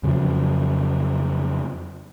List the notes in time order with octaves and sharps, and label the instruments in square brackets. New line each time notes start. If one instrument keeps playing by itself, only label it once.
[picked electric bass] F2 C#3 F3 F#3